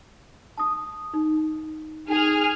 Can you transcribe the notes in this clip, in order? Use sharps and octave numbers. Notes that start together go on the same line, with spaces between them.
A5 D#6
D#4
D#4 G#4 F6